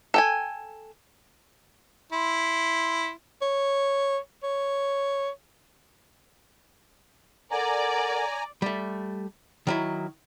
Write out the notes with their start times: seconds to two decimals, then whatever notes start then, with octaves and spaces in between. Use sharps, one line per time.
0.14 A4 G5 G#5
2.12 E4 C6
3.42 C#5
4.43 C#5
7.51 A4 A#4 D5 F#5 G#5 A#5
8.62 G3 A3
9.67 D#3 F#3 E4